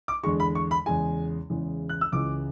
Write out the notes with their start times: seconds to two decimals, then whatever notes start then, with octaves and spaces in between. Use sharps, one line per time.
0.08 D6
0.24 E2 D3 G#3 C#6
0.40 B5
0.55 C#6
0.71 B5
0.86 E2 C#3 G#3 G#5
1.50 E2 C#3 E3 G#3
1.89 F#6
2.01 E6
2.12 C#2 C#3 E3 D6